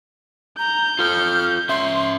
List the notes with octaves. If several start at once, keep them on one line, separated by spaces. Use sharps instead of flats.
A#5 G6
F4 A4 F6
C#4 E5 C6